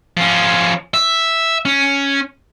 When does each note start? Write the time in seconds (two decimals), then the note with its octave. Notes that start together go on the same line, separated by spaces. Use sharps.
0.17 F3 C#4
0.94 E5
1.65 C#4